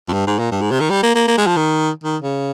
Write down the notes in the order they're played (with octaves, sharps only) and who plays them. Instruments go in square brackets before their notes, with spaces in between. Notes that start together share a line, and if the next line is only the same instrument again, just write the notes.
[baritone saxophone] F2
G2
G#2
A#2
G2
G#2
C3
D#3
G3
A#3
A#3
A#3
G#3
F3
D#3
D#3
C#3